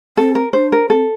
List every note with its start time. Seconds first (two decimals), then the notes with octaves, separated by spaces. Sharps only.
0.17 C4 A4
0.35 A#4
0.53 D4 C5
0.72 A#4
0.89 C4 A4